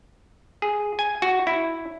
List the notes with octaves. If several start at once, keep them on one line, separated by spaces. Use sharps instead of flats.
G#4
G#5
F#4
E4